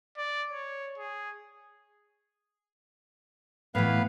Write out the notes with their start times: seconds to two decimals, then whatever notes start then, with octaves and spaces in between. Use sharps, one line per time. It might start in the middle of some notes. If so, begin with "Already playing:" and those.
0.18 D5
0.52 C#5
0.98 G#4
3.75 A2 E3 B3 B4 F5